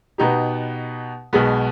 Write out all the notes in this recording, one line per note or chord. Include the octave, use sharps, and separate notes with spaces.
B2 B3 D#4 G4
B1 B2 G#3 B3